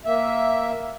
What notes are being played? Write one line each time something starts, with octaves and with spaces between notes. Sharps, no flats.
A#3 E5